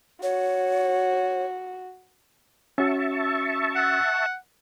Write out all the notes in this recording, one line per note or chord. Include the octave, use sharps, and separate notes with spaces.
F#4 C#5
C#4 F#4 E5 A5 C#6
F#5